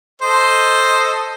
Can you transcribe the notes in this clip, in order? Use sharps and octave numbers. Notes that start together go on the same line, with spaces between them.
A4 C5 D#5